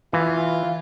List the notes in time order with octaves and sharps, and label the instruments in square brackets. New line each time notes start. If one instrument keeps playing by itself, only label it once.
[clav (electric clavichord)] E3 [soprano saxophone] F4